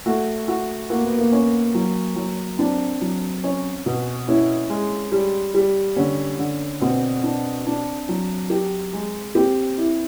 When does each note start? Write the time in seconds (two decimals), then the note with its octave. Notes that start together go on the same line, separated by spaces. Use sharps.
0.06 A3 F#4
0.48 F#4
0.90 A#3 F#4
1.04 B3
1.18 A#3
1.32 C#4
1.75 F#3
2.16 F#3
2.59 C4 D4
3.01 F#3
3.44 C#4
3.86 B2
4.27 C#4 E4
4.70 G#3
5.12 G3
5.54 G3
5.96 D3 C#4
6.39 D3
6.81 B2 C4
7.24 D4
7.67 D4
8.09 F#3
8.50 G4
8.93 G#3
9.35 C4 G4
9.77 E4